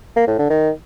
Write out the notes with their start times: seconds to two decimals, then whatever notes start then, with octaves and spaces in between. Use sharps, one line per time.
0.16 A#3
0.28 A2
0.39 D3
0.50 D#3